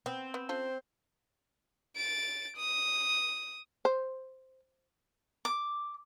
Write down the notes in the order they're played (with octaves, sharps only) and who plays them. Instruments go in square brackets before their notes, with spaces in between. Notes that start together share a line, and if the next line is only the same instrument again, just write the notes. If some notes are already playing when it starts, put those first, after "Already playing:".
[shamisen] B3 [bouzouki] C4
[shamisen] B3
[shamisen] C#4 F4 A4 [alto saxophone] C5
[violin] A6 D7
D#6
[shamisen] C5
[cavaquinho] D6